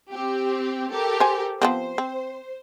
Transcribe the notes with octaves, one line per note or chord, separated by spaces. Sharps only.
C4 G4
G4 A4 A#4
C5 G#5
F3 B3 C4 C5
C4